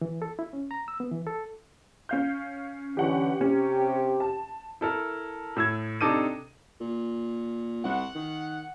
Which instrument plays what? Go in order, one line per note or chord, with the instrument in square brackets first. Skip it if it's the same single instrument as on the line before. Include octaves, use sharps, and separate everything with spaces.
[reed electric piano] E3
A4
E4
C#4
A#5
E6
B3
E3
A4
[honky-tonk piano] C#4 F5 G6
[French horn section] D3 E3 C#4 [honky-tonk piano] G4 F#5 C#6
[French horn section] C3 G4 [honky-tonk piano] C#4
[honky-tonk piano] A5
[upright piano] E4 A4 A#4
A2 E6 G#6
C3 D4 D#4 A4 D6 D#7
[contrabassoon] A#2
[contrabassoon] C2 [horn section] F#5
[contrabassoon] D#3